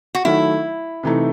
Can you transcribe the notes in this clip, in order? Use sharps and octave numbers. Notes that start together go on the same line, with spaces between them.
F#4
D#3 F#3 A3 E4
C3 E3 A3 D#4